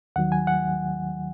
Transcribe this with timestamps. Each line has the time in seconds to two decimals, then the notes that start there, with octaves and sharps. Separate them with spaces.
0.16 D#2 D#3 F#3 F#5
0.32 G#5
0.47 F#5